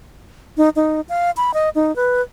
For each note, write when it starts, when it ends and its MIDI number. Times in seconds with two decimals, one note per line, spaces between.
0.57 0.69 63
0.76 1.01 63
1.09 1.31 77
1.37 1.54 83
1.54 1.69 75
1.75 1.95 63
1.96 2.21 71